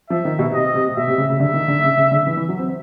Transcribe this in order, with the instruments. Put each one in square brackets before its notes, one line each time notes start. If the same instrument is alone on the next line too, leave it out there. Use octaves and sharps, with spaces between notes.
[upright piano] F3 [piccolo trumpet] E5
[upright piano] D#3
B2
[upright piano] C3 [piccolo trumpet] D#5
[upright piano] C3
[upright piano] B2 [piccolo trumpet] E5
[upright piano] C3
C#3
C#3
[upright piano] D3 [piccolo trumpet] E5
[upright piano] D#3
D3
C#3
C#3
D3
E3
E3
F#3
C4